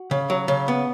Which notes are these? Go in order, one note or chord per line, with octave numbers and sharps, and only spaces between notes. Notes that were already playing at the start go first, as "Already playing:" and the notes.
Already playing: F#4
C#3
F#3
C#3
B3